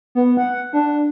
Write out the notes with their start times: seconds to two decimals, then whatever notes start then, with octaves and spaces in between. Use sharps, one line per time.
0.15 B3
0.37 F#5
0.73 D4